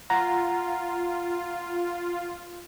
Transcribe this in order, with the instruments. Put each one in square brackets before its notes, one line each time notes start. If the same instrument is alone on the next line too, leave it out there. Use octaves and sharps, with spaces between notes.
[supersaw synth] F4 [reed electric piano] F#5 A#5